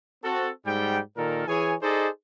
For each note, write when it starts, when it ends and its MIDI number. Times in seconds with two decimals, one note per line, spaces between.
0.24 0.50 60
0.24 0.50 66
0.24 0.50 69
0.66 1.00 44
0.66 1.00 55
0.66 1.00 79
1.17 1.44 46
1.17 1.44 51
1.17 1.44 69
1.17 1.44 70
1.47 1.75 52
1.47 1.75 68
1.47 1.75 73
1.47 1.75 80
1.82 2.08 63
1.82 2.08 68
1.82 2.08 69
1.82 2.08 72
1.82 2.08 74
1.82 2.08 75